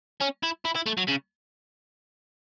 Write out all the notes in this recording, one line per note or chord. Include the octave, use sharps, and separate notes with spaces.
C#4
E4
E4
E4
A3
F#3
C#3